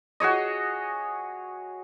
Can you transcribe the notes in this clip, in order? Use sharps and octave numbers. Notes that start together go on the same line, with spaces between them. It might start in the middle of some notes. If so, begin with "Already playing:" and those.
F#4 G#4 C#5 D#5